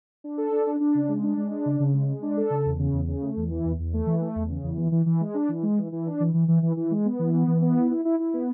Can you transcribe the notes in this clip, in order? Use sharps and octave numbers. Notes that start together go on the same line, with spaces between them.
D4
A4
D4
D4
D4
C#3
G#3
D4
G#3
D4
C#3
C#3
G#3
G#3
D4
A4
C#3
E2
C#3
E2
C#3
A3
E2
E3
E2
E2
A3
E3
A3
E2
C#3
E2
E3
E3
E3
G#3
D4
E3
G#3
E3
E3
D4
E3
E3
E3
E3
E3
G#3
B3
E3
B3
E3
B3
E4
E4
E4
E4
B3